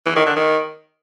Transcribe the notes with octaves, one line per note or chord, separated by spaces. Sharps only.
E3
D#3
D3
D#3